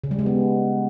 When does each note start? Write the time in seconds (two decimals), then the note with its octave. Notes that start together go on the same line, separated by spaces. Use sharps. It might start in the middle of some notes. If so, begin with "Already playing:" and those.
0.04 C#3
0.11 G3
0.19 G#3
0.26 B3